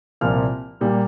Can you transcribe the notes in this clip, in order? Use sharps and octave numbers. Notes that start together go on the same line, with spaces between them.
C2 A#2 F3 A#3 F6
A#2 G3 A#3